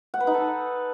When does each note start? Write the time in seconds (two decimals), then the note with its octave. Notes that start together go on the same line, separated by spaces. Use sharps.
0.14 F#5
0.20 B4
0.27 D#4
0.34 A4